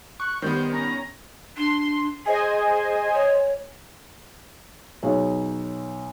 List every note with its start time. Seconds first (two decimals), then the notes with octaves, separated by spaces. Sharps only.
0.20 C#6 F#6
0.42 D#3 G3 B3 C5 G6
0.72 C#4 A#5
1.57 D4 C6
2.26 G#4 C5 D#5 G#5
3.13 C#5
5.03 B1 G#4 C#5